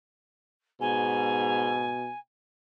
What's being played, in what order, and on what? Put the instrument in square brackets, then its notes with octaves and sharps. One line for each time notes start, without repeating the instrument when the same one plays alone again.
[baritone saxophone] G#2 [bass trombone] B2 [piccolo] G#5